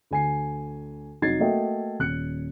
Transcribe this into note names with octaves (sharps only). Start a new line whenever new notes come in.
D2 G#5 C7
F1 F#3 D#4 G#6 A6 C7
A3 A#3 F#4 D#5 E5 G5
D#1 F#6 C#7